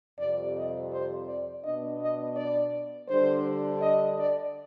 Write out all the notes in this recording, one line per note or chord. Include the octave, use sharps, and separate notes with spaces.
F2 C3 G3 D5
D#5
C5
D5
B2 B3 D4 D#5
D#5
D5
D3 G3 D4 C5
D#5
D5